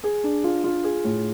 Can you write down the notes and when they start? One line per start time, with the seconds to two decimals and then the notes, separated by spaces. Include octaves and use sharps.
0.04 G#4
0.24 D4
0.44 F4
0.64 F4
0.84 G#4
1.04 A2